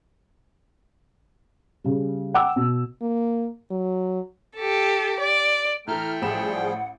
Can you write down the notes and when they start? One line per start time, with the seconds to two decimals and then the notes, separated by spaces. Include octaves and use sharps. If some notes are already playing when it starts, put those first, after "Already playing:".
1.84 C#3 G3
2.34 F#5 G5 D6 E6
2.56 B2
3.02 A#3
3.71 F#3
4.56 G4 A4
5.20 D5
5.87 A2 E3 A3 G5 A#5 F6
6.22 A1 F3 G3 G#4 F#5 B5 E7